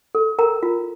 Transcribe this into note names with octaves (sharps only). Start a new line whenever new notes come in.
A4
A#4 A#5
F4